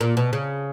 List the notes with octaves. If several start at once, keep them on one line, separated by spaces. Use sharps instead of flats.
A#2
B2
C#3